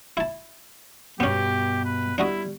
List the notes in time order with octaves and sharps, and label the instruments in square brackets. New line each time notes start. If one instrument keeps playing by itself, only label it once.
[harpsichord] E4 A5
[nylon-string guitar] G2 B2 [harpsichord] B3 C#4 [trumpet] G4
[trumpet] B4
[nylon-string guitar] G3 [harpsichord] D4 F#4 D#5 [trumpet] E4